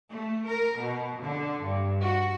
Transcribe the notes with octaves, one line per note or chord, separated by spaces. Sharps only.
A3
A#4
B2
D3
G2
F#4